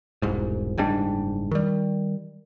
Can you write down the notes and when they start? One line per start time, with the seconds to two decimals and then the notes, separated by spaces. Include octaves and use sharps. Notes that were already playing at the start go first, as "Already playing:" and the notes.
0.22 E1 C2 G#2
0.78 F#1 G#2 G3 D4
1.51 D#3 G3